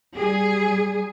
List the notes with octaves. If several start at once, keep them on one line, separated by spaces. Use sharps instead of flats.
G3 G#4